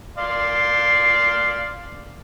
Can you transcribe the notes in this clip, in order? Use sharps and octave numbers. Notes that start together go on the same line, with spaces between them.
D5 F5 C6